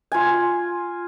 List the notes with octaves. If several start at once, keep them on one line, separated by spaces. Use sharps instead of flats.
F4 G#5